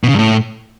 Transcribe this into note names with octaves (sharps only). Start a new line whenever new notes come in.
B2
C#3
G2
A2